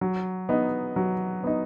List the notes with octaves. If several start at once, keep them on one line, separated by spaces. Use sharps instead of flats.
F#3
B3 D#4
F#3
B3 D#4